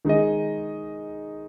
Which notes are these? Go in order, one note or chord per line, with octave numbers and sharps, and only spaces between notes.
D#3 G#3 D#4 G#4 D#5